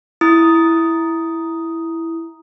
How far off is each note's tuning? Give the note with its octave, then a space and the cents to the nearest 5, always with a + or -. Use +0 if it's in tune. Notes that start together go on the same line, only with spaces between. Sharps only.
E4 +0 D#6 +0